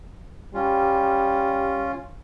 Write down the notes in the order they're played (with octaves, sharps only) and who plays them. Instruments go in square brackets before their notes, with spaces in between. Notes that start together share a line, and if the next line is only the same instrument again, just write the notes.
[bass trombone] G3 [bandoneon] C#4 F4